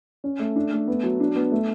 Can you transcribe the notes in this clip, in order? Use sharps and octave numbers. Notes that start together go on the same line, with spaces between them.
C#4
A3
D4
A3
B3
F#3
D4
B3
A3